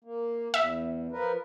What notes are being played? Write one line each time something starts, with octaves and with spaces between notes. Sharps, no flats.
A#3
E2 E5
F3 A#4 B4